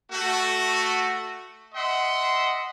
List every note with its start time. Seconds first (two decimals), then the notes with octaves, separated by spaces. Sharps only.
0.11 A3 F#4
1.75 D#5 E5 F#5 C6